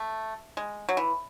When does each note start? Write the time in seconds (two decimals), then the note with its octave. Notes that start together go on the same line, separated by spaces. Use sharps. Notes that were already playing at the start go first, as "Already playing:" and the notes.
Already playing: A3
0.57 G#3
0.89 F#3
0.97 E3